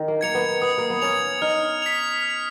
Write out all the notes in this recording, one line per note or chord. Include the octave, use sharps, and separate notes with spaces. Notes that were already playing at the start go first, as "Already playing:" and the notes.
Already playing: D#3
A#3
A#3 G#6 C#7 F7
B3
B3 D#6
A#3
B3
C#4 G#6 C#7 F7
D#4 F6
B6 F7
F6